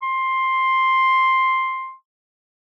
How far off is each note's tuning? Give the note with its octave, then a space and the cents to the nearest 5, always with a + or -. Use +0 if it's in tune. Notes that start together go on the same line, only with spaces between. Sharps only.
C6 +5